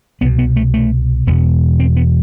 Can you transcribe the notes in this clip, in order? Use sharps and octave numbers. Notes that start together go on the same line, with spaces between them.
C2 B2 B3
B3
A3
A3
E1 E2 B2 B3
C4
B3